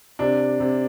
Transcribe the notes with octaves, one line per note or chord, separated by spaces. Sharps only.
C3 D4
C3